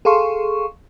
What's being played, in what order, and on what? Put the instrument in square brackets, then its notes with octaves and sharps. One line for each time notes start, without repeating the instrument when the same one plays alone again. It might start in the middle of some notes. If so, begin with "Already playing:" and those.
[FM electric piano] G#4 A4 F5 C6 C#6